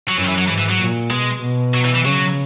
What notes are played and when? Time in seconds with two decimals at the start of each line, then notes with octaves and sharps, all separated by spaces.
0.08 F#3
0.16 F#2 E3
0.23 D#3
0.28 E3
0.38 F#3
0.48 G#2 E3
0.58 E3
0.69 F#3
0.80 A#2
1.11 B2 G#3
1.42 B2
1.74 F#3
1.84 E3
1.95 E3
2.05 C#3 F#3